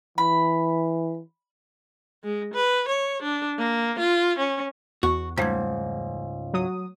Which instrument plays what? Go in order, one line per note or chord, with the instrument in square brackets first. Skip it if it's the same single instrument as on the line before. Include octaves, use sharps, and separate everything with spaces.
[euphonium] E3 [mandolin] B5
[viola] G#3
B4
C#5
D4
A#3
F4
C#4
[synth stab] E2 [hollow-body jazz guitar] F#4 [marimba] C#6
[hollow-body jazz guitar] C#2 G#2 [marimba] G3 A3 G#6
[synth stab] F#3 D#6